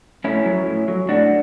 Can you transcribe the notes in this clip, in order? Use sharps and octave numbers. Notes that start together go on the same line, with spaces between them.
A2 C#4 E4
F#3
A2
F#3
A2 D4 F#4